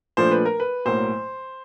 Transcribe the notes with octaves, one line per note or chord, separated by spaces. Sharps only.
A#2 F3 A3 D4 C5
B4
A#4
B4
B1 A2 F#3 A#3 C5